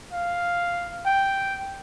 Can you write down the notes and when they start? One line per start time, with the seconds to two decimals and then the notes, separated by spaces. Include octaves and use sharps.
0.12 F5
1.06 G5